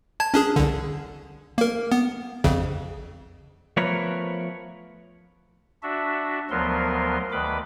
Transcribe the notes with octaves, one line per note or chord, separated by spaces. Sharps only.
A5 G#6
C#4 D4 G#4
C2 D3
A#3 A#4
B3
A#1 F2 C#3
F3 A3 B3 A#4 B4 C#5
D4 F#4 E5
D2 F3 F#3 B3 A#4 C6
D2 D#3 B4 B5 D6